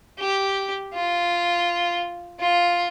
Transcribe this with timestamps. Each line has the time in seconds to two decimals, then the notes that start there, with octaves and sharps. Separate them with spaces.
0.19 G4
0.93 F4
2.40 F4